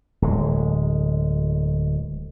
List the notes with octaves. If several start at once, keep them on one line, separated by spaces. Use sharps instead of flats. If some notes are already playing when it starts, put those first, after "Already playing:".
D1 G#3